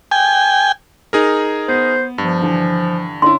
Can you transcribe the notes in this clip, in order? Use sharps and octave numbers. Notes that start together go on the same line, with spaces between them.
G5 G#5
D#4 G#4 A#4
B3 C5
G2 F3
D3 E3
D3 C#4 E4 C6